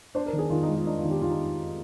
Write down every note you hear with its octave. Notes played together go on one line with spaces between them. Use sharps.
D4 C5
A#4
D#3
G#4
D#3 F4
D#4
G#3
F4
D4 D#4
F4
D#3
G4
D#3 F4
D#4